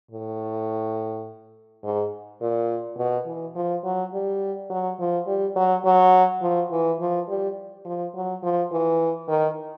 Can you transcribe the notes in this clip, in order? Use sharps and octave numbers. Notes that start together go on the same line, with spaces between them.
A2
G#2
A#2
B2
E3
F3
F#3
G3
F#3
F3
G3
F#3
F#3
F3
E3
F3
G3
F3
F#3
F3
E3
D#3